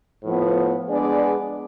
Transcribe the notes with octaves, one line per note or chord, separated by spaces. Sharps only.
A2 F3 B3
G#3 B3 D4 G#4 D5